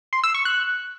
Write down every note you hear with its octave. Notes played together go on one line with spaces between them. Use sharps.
C6
E6
C#6
F#6